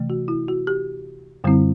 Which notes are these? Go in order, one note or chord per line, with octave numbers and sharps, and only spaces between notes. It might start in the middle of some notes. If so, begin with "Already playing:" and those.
Already playing: C3 E3 A3
F#4
E4
F#4
G4
F#2 D3 G3 C4 E4